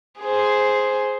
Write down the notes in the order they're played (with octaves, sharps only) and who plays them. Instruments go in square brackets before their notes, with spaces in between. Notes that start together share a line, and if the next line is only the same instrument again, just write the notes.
[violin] G#4 C5